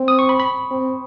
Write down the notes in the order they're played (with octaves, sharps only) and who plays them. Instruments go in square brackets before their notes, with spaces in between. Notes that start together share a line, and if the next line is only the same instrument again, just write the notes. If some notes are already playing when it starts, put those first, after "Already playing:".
Already playing: [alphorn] C4
[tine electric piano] D#6
C#6
B5
B5
[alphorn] C4